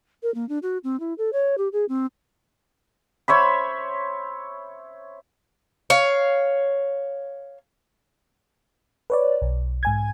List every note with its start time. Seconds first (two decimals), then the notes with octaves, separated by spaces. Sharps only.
0.23 A#4
0.35 A#3
0.49 D4
0.63 F#4
0.84 C4
1.00 E4
1.18 A4
1.33 C#5
1.58 G4
1.73 G#4
1.89 C4
3.28 C5 C#5 E5 B5
5.90 C#5 F5
9.10 B4 C#5 D5
9.42 B1
9.83 G#2 G#5 G#6